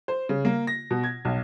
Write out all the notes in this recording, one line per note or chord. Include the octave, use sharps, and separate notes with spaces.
C5
C#3
A#3
A#6
B2
G#6
B1